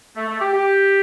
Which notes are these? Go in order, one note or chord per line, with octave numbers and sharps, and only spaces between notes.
A3
A3
G4
G4